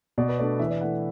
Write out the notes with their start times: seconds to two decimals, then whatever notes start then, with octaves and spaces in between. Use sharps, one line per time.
0.18 B2 D5
0.29 B4
0.39 A3 D4 D5
0.59 E3 E5
0.66 B4
0.70 D5
0.81 A3 E4 F#5